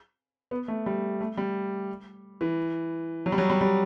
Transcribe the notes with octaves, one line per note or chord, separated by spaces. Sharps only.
B3
A3
G3
A3
G3
E3
F#3
G3
F#3
G3
G3